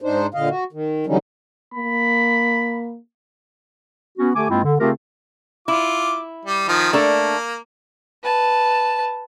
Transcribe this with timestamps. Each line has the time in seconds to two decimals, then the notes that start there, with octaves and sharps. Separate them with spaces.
0.02 G#2 D4 D#4 C5
0.34 A#2 D3 D#5 F5
0.49 F#4
0.73 D#3
1.07 D3 E3 F#3 G3 C#4 D#4
1.74 A#3 B5
4.18 B3 C#4 F#4
4.36 D3 A3 G4 G#5 D6
4.50 G2 G#3 A#3 C4 E4 F4
4.64 D3
4.80 C#3 A3 C4 F4 G4 A#4
5.68 E4 F4 D6
6.46 G3
6.68 D#3 F3
6.93 A3 A#3 D4 A4
8.23 B4 A5